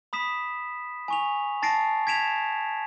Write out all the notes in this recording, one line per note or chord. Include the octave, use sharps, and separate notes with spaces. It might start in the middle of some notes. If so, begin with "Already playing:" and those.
B5 D#6 B6 E7
G#5 C#6 F7
A5 A6 A#6 C7 D7
G#6 B6 D7 E7 F7